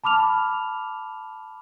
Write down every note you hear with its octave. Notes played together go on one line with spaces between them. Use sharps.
A5 B5 D6 F6 F7